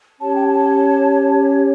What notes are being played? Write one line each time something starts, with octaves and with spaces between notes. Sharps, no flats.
C#4 G4 C#5 A5
G5
A5